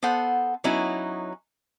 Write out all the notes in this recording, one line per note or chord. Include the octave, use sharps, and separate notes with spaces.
B3 A4 C5 F#5
F#3 B3 C#4 D#4 E4